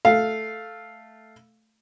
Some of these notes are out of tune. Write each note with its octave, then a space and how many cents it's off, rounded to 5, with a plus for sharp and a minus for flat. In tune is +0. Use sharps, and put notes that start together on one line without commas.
A3 +0 F5 +0